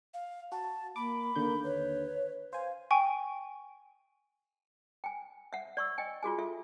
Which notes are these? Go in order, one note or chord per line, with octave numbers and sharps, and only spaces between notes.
F5
F#4 A5
A#3 B5 D6
D#2 D3 A#3 G6
B4 C#5
C5 F5 G#5
G5 G#5 C#6
G5 G#5
E5 F#5
D5 C#6 E6
D#5 G5 G#5
F4 F#4 G#4 G#5
F4 A4 E5